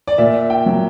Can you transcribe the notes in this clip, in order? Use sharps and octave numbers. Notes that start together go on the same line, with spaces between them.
D5
A#2 E5
G5
F#3